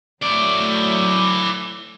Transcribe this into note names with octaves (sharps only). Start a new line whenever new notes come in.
F#3 A3 E4 D5